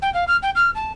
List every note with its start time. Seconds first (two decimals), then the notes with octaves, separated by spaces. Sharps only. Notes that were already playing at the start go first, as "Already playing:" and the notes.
0.02 G5
0.14 F5
0.27 F6
0.42 G5
0.55 F6
0.75 A5